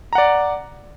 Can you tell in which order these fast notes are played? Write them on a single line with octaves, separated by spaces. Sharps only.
A#5 F#5 D5